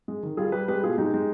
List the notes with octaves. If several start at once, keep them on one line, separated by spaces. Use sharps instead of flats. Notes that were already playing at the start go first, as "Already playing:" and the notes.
G#3
D#3
G3 F4 G#4
G3 G4 B4
G#3 G4 B4
B2 F4 G#4
G#3 D#4 G4
G#3